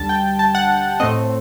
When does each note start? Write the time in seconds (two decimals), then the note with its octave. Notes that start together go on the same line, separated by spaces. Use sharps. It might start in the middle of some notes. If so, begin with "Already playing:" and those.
Already playing: D2 D3 G3 A5
0.09 G5
0.39 A5
0.55 F#5
1.00 A2 A3 C4 D#5